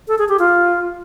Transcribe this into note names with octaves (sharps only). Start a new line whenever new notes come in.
A4
G#4
G4
F4